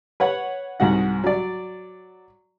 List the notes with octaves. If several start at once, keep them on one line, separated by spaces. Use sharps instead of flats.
B4 C#5 F#5
C2 G#2 F#4 F#5
F#3 D5